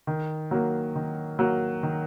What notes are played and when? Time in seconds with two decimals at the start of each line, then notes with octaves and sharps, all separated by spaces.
0.07 D#3
0.51 F#3 A#3
0.95 D#3
1.39 F#3 A#3
1.83 D#3